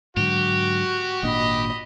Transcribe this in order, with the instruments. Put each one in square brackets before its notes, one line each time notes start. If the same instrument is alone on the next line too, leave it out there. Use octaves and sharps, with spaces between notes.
[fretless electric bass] G#2 D3 F#3 [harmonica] F#4 [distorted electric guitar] G4
[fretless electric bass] G#1 A#2 D4 [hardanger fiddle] D#5 B5